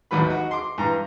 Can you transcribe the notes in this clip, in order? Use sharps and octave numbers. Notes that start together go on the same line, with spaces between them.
A1 D#2 F#3 B4 B5
D#4 F#4
C6 D6
G2 E3 A#5